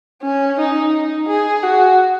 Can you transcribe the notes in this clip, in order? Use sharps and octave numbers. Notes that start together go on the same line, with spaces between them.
C#4
D#4
D#4
G#4
F#4